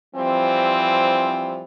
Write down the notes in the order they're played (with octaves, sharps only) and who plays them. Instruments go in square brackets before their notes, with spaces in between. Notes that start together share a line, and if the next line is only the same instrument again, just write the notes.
[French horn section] E3 F3 G3 C4